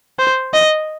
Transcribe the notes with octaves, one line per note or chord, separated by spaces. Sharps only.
C5
D#5